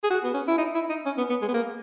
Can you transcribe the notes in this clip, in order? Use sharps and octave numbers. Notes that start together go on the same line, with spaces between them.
G#4
F#4
B3
C#4
E4
D#4
E4
D#4
C#4
B3
B3
G#3
B3
A#3